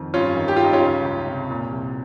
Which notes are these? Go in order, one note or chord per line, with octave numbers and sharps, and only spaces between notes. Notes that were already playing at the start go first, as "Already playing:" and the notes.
Already playing: F2 D#3
G2 C#4 F4
D#3
G4
G2 F4
D#4
C#4 F4
C#2
C#2
C3
A#2
C2